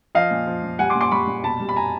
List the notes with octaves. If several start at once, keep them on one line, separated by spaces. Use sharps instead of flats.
F3 D#5 F5
A#2
F3
A#2
G3 F#5 G#5
C6 D6
A#2
C6 D6
G3 B5 C#6
A#2
B2 A5 B5
G3
B5
G#5 A#5